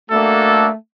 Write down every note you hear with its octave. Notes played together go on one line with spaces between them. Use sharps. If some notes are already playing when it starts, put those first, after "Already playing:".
A3 A#3 D4 F#4 A4